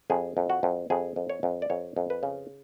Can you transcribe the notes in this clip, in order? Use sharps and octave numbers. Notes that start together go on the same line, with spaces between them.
F2 G#4
F2
F#4
F2
F2 G#4
F2
C#5
F2
D5
F2 C#5
F2
B4
C#3